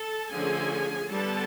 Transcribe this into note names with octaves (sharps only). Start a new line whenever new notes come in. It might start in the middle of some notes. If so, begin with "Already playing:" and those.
Already playing: A4 A5
D3 F3 A3 C#4 G#4 G#5
D3 G3 B3 A4 A5